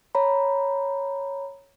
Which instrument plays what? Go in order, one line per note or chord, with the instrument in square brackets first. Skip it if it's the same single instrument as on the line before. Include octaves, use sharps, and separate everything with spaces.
[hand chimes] C#5 A#5 B5